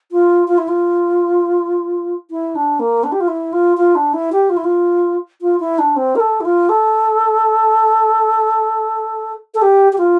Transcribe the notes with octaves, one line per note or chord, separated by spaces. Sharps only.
F4
F4
E4
F4
E4
D4
A#3
D4
G4
F4
E4
F4
F4
D4
E4
G4
F4
E4
F4
F4
E4
D4
C4
A#4
A4
E4
F4
A4
A4
G4
G4
F4